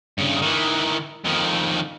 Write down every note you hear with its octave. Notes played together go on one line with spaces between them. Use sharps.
G2 C#3
D#3 E3
F2 D#3